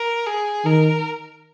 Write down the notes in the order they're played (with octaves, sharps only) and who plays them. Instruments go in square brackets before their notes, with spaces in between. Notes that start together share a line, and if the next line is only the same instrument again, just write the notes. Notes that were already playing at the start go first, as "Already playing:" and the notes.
Already playing: [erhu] A#4
G#4
[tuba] D#3 [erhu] A#4